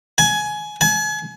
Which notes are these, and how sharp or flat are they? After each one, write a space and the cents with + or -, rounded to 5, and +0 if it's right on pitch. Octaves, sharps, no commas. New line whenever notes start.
G#5 +20
G#5 +35